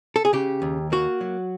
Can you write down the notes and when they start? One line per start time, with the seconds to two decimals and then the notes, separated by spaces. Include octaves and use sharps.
0.16 A4
0.25 G#4
0.33 C#3 G4
0.62 D#2
0.92 A#3 F#4
1.21 F#3